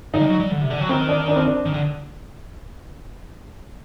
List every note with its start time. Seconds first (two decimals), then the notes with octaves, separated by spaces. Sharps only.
0.14 D3 D#4
0.21 G3
0.27 F#3
0.40 G3
0.51 D3
0.61 C3
0.70 D3
0.80 F#3
0.89 D#3 C4
1.09 D4
1.28 D4
1.36 C4
1.45 D4
1.65 D#3
1.73 D3